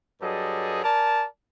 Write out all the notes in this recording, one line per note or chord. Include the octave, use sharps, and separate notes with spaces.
G2 F#3 G3 G#4 A4 D#5
A#4 D5 G#5 A5